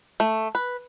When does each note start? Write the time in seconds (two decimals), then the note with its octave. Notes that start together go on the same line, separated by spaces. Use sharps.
0.20 A3
0.55 B4